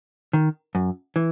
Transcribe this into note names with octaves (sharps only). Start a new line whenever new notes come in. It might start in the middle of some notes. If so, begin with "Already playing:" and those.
D#3
F#2
E3